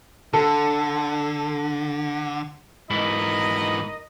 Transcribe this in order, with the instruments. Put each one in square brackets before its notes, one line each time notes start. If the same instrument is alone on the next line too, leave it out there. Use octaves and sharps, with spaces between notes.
[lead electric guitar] D3 [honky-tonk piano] A4
[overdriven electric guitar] G#2 E3 [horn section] D#4 A#4 D#5 [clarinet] B5